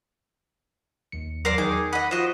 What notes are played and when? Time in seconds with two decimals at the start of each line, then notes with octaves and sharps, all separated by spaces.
1.12 D#2 D#3 C#7
1.45 E2 F#3 A#4 C5 D5
1.58 D#3 G#4 D6
1.93 D#5 F#5 B5 D#6
2.11 F3 F#4 C5 D#5